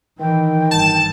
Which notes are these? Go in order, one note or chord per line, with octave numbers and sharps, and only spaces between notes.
D#3 E3 G5
G1 G2 A5